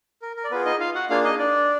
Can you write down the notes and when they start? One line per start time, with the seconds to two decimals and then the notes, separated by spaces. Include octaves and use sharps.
0.22 A#4
0.37 A#4
0.44 D5
0.51 B3 F4 G#4 B4
0.65 D#4 D#5
0.80 F4 F5
0.95 F#4 F#5
1.10 A#3 D4 F4 G#4 F5
1.24 D#4 D#5
1.38 D4 D5